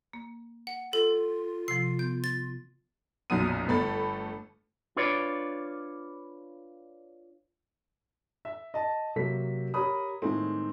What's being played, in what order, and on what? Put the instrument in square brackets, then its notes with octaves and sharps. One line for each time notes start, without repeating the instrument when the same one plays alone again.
[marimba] A#3
[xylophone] F#5
[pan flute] F4 [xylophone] A4
[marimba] C3 F3 [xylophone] C7
[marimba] B3 [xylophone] G6
[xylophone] A6
[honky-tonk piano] B1 F#2 A#2 F#4 D#6 D#7
G1 A3 B5 A6
[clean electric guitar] D4 F4 B4 C#5 D5
[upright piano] E5
D#5 A5
C3 F#3 A#3 B6
G4 A#4 C#5 B5 D#6
A2 D#3 G#3 A#3 C4